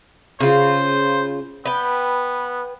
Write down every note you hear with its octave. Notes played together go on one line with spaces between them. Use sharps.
C#3 F4 C5
B3 B4 G5